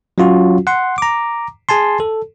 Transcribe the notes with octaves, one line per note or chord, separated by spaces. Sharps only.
F#3 C#4 F4 F#4
F#5 C6
A#5 D6
G#4 G#5 A5 C6
A4